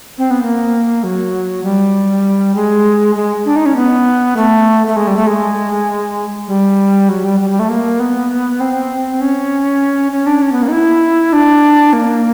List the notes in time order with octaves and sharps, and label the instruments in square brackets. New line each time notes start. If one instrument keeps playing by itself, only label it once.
[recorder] C4
B3
A#3
F#3
G3
G#3
G#3
D4
D#4
C#4
B3
A3
A3
G#3
G3
A3
G#3
G3
F#3
G3
G3
G3
A3
A#3
B3
C4
C#4
C#4
D4
C#4
B3
A#3
D#4
E4
D4
A#3